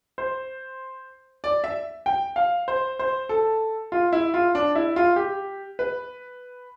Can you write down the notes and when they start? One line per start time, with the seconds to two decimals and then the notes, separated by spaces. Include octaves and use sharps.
0.18 C5
1.44 D5
1.64 E5
2.06 G5
2.36 F5
2.68 C5
2.99 C5
3.29 A4
3.92 F4
4.12 E4
4.34 F4
4.55 D4
4.75 E4
4.96 F4
5.16 G4
5.79 B4